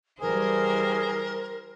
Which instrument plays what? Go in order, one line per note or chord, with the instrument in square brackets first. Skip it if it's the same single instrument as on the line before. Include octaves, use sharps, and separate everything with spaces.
[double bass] E3 G3 [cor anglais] G#4 [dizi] A#4 [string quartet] C5